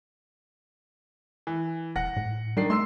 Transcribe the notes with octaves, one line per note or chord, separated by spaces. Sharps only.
E3
E1 F#5 A#6
A2
D#3 G3 D4 C7
A3 C6 E6 C7